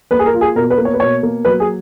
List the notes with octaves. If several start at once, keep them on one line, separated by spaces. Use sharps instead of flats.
A#3 B4
G#4
A#4
F4
G#4
B2 A#4
B4
A#3
C#5
B4
B2 C#5
A#3
F#3 B4
G#4